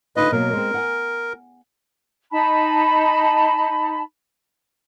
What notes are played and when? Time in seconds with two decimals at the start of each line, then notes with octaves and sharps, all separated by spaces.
0.16 D3 D#4 F4 B4 D#5
0.32 B2 F#3 A#3 A#4
0.53 G#3 C4
0.74 F#5 G#5
2.31 D#4 A5 B5